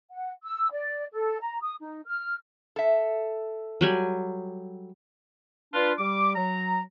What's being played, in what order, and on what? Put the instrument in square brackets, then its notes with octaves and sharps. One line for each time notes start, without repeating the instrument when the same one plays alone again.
[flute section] F#5
E6
D5
A4
A#5
D#6
D#4
F6
[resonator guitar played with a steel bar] A4 E5
[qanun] F#3 G3 G#5
[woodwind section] D4 F4 B4
G3 D6
F#3 A#5